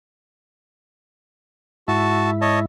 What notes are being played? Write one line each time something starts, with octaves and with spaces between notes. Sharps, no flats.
G#2 E4 F#4 A5
C#5 D#5 A5